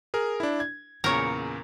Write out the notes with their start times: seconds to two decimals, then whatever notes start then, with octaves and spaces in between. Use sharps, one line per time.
0.14 G#4 A#4
0.40 D4 E4
0.60 G#6
1.04 E2 A#2 C#3 A#4 C#5